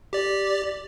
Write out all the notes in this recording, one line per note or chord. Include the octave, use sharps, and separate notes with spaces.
G4 D5